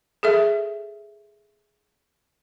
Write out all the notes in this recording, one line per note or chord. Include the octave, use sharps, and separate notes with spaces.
G#4 A4 E5